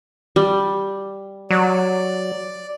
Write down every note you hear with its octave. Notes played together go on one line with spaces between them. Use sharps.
G3
F#3 D5